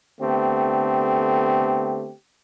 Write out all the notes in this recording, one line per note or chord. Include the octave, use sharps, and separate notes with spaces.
D3 A3 B3 C4 G4